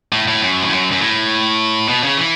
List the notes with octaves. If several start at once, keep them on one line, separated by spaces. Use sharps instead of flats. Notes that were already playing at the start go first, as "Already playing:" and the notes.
A2
A2
F#2
A2
F#2
F#2
A2
B2
C#3
E3